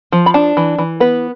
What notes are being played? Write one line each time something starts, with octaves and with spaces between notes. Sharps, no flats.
F3
B5
D4 A5
E3
E3
B3 B4